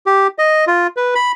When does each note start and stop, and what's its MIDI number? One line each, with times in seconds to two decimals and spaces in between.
0.06 0.27 67
0.38 0.65 75
0.67 0.87 65
0.97 1.14 71
1.15 1.32 83